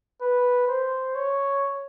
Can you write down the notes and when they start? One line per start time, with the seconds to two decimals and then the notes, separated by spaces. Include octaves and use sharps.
0.21 B4
0.68 C5
1.15 C#5